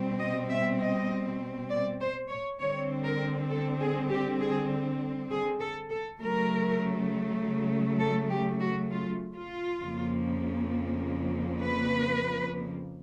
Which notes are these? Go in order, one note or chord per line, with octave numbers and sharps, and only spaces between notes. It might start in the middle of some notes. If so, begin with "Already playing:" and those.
Already playing: B2 G3 C4
D#5
E5
D#5
D5
C5
C#5
D3 G3 C4 C#5
A#4
A4
G#4
G4
G#4
G#4
A4
A4
C#3 F#3 A3 A#4
A4
G4
F#4
F4
F4
F2 C#3 F3 A#3
B4